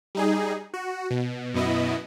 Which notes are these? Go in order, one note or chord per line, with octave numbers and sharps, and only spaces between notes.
G3 D#4 G#4
F#4
B2
F#2 B2 B3 E4 D#5